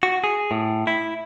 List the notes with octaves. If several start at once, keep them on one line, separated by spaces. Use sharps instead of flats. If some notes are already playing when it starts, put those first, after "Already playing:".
F#4
G#4
A2
E4